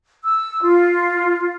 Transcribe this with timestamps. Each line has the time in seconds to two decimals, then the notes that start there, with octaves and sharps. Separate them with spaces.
0.24 E6
0.63 F4